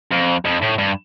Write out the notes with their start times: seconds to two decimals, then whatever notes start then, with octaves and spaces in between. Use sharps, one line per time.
0.11 F2
0.45 F2
0.62 A2
0.78 G2